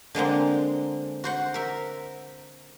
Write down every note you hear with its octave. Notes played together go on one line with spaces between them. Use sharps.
D3 G#3 A#3 C4
F#4 C5 F#5
A#4 E5